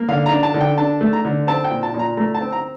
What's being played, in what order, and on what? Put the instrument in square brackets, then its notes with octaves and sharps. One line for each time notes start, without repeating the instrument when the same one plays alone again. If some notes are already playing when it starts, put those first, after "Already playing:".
Already playing: [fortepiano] A#3
D3 F5
A#5
D4
A5
D3
G5
D4 A5
A3
A#5
D3
C4 A5
G5
A#2
A5
A#2
A#5
A3 A#5
A5
C4
A#5